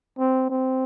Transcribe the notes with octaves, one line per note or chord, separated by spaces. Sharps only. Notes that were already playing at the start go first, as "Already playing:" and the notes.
C4
C4